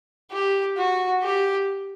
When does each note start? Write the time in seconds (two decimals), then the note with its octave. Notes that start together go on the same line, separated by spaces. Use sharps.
0.31 G4
0.77 F#4
1.23 G4